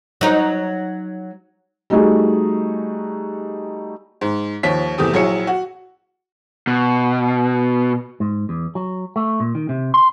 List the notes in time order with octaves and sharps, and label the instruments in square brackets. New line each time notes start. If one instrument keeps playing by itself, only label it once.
[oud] F#3 D#4
[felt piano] G3 A3 D#4 F#4 G#4
[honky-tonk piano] G#2
D#2 F3 C#5 B6
E2 C3 A3 G4 D#6
A#1 F#3 E4 G#4 C#5 C#7
F#4
[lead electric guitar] B2
[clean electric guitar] G#2
E2
F#3
A3
A#2
D#3
C3
C6